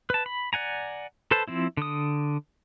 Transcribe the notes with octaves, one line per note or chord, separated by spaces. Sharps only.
B4 A5
B5
D5 F#5 G#5 A#5
A4 B4 C5 A5
F3 C4 E4
D3 D#6